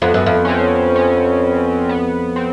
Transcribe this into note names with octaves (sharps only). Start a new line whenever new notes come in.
F2 B3
F#2
F2
C#4
C4
C#4
B3
C4